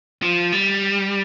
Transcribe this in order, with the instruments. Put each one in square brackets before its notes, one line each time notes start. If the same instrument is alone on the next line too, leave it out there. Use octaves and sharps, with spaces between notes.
[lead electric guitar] F3
G3